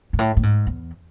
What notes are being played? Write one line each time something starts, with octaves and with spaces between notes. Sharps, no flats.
G#2
A2
A2
G#2
E2